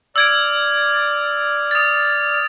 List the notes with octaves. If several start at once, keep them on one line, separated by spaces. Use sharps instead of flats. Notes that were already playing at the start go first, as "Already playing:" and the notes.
D5 E6 F6 G#6 D7
D#6 A6